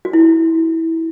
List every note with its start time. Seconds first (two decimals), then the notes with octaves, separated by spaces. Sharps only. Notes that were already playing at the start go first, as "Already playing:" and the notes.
0.05 F#4
0.13 E4